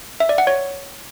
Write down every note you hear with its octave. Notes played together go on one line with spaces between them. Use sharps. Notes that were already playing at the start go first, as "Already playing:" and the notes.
E5
D5
F#5
C#5